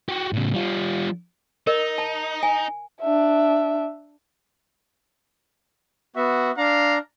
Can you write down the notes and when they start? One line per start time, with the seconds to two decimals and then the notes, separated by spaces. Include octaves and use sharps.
0.09 F#4 G4
0.33 A2 C#3
0.54 G3 F4
1.67 D#4 A#4 D#5
1.98 A5
2.43 G#5
3.01 D4 E5
6.16 B3 F#4 E5
6.57 D4 F5 A#5